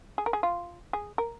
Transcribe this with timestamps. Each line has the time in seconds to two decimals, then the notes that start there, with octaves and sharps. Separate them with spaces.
0.18 G#4
0.26 A#4
0.33 G#4
0.43 F4
0.93 G#4
1.18 A#4